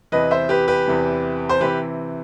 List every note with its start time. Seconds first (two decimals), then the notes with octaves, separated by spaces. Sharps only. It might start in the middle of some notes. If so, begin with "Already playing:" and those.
0.12 E2 C3 E3 B4 D#5
0.31 C5 E5
0.49 G4 B4
0.68 G4 B4
0.87 E2 C3 E3
1.49 C5
1.61 C3 E3 G4 B4